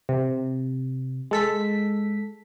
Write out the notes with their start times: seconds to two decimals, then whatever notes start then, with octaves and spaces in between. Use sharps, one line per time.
0.09 C3
1.31 G#3 A4 B6